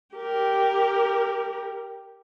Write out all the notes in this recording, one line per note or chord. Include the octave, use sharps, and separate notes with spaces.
G4 A#4